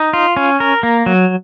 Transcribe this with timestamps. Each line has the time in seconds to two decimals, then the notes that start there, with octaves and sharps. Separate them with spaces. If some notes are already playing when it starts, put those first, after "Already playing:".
Already playing: D#4
0.13 F4
0.37 C#4
0.60 A#4
0.83 A#3
1.06 F#3